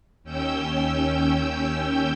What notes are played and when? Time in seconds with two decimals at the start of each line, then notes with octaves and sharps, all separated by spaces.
0.24 D#2 C#4 G5 E6 G6